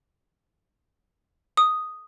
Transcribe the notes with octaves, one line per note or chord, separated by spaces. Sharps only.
D#6